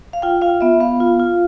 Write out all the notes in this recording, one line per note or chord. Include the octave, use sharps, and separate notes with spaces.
F5
F4 G5
F4 F5
B3 E5
B3 F5
F4
F4